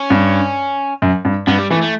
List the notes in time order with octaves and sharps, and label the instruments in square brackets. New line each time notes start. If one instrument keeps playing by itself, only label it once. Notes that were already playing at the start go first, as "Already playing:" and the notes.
Already playing: [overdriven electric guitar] C#4
[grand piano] G2
F#2
G2
[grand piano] G2 [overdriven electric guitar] B3
[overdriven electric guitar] G3
[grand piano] E3 [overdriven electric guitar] A3
[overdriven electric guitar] A3